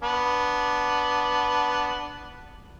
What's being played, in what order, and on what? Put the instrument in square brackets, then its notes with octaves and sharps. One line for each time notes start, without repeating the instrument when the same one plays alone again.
[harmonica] B3 D4